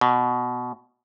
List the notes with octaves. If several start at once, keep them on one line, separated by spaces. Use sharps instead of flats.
B2